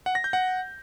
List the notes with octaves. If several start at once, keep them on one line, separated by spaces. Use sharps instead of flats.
F#5
A#6
G6
F#5